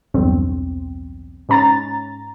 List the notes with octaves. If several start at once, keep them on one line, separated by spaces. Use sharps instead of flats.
B1 E2 G2 C4
G#2 C#4 A#5 A6